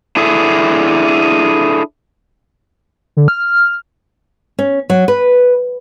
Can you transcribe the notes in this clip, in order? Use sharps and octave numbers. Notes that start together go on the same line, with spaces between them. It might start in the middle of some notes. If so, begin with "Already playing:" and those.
D4 E4 G#4 A4 E5
D3
F6
C#4
F#3
B4